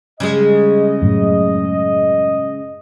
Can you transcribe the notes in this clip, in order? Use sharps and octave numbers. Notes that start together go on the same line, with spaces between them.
C#3 G3 G#3 D#5
F#2 A2